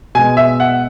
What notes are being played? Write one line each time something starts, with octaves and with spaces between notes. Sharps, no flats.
B2 G#3 G#5
E5
F#5